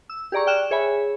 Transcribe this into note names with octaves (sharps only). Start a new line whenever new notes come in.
E6
G4 G#4 D5 A#5 C#6
D5 G5 F6 F#6 E7
G#4 C#5 E5 G#5 B5